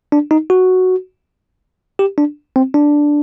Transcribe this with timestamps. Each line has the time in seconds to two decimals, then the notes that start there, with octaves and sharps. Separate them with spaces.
0.12 D4
0.31 D#4
0.50 F#4
1.99 G4
2.18 D4
2.56 C4
2.74 D4